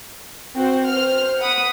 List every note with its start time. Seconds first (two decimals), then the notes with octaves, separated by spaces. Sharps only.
0.55 C4 F#4 C5
0.88 C5 F6
1.38 F#5 B5 D#6